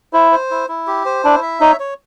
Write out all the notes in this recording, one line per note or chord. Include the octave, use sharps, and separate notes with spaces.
E4 C5
C5
E4
E4
G4
C5
D4 E4
E5
D#4 C#5
C#5